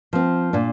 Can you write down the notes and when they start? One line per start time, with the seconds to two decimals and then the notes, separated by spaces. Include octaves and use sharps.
0.13 F3 C4
0.53 A#2 D4